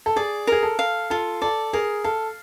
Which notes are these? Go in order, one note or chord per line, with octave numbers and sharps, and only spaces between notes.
A4
G#4 D5
G#4 A#4
A4
F5
F4 A4
A4 D5
G#4 A#4
A4 F5